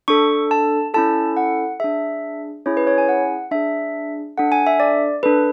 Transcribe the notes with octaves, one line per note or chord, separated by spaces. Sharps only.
D4 A4 C#6
A5
C#4 E4 A4 A5
F#5
D4 G#4 E5
C#4 E4 G#4 C#5
B4
C#5
G#5
F#5
D4 G#4 E5
D4 A4 F#5
G#5
E5
D5
D4 A4 B4